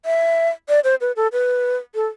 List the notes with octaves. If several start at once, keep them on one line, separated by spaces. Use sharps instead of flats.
E5
D5
C5
B4
A4
B4
A4